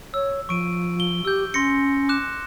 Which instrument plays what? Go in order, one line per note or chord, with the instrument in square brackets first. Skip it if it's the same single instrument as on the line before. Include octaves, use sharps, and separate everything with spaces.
[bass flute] C#5 [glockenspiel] E6
[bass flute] F3 [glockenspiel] C#6 D7 D#7
[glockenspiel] G7
[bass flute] G4 [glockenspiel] E6 G6
[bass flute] C#4 [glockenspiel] C6 A#6 C#7
[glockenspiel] D6 F#6 E7